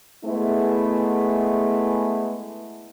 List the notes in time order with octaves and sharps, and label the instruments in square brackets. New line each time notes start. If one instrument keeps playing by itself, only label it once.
[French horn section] G#3 A3 B3 E4 G#4